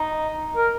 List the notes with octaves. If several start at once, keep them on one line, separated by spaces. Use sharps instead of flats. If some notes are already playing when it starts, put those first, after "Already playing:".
Already playing: D#4
A#4